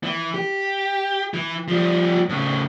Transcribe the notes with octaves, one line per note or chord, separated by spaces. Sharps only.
E3
G4
E3
F3 G3
A2 C#3